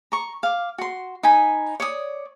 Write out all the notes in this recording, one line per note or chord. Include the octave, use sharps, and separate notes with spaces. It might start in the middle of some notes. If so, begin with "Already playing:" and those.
A#5 C#6
F5 D6
F#4 C6
D#4 G#5 B5
C#5 D5 D#6